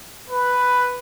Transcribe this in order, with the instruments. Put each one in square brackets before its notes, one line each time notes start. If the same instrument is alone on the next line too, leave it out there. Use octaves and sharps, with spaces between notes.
[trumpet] B4